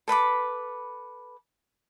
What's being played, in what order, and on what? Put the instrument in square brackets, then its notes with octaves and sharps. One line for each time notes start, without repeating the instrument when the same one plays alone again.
[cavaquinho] A4 B4 B5 D6